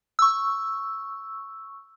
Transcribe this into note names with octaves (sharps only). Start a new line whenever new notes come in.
C#6 E6